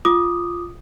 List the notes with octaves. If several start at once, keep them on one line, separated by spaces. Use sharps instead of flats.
F4 D6 D#6